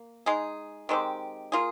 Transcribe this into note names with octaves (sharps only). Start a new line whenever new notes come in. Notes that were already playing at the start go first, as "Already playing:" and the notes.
Already playing: A#3
G#3 D#4 G#4
D#3 G#3 C4 G4
A#3 F4 G#4